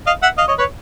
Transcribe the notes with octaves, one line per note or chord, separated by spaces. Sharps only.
D#5 F5
E5 F#5
D#5 F5
C#5 D#5
B4 C#5